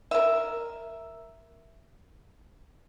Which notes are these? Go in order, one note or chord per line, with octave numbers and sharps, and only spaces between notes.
A#4 E5